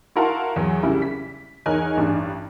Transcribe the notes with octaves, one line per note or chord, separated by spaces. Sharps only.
E4 F#4 A#4 F5 A5 C6
E2 F#3
C2 C#3 G3 E4
B6
E2 D#4 A#4 C#5 G#5 F#6
A1 G2 D4